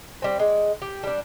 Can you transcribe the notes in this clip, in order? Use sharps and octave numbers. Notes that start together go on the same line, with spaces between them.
G3 C4
G#3
G4
G3 D4